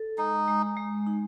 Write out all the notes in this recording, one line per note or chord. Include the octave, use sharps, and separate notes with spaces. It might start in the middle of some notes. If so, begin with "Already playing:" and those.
Already playing: A4
G#3 D#4
G#3
G#3
D#4